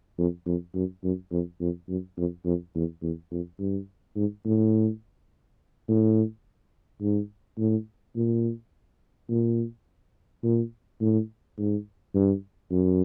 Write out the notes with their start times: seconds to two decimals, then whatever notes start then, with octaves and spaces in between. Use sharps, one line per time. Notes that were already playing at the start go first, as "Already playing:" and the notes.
0.18 F2
0.46 F2
0.75 F#2
1.04 F#2
1.32 F2
1.61 F2
1.89 F#2
2.17 F2
2.45 F2
2.75 E2
3.03 E2
3.32 F2
3.60 G2
4.16 G#2
4.45 A2
5.88 A2
7.01 G#2
7.58 A2
8.16 A#2
9.29 A#2
10.44 A#2
11.01 A2
11.58 G#2
12.15 G2
12.72 F#2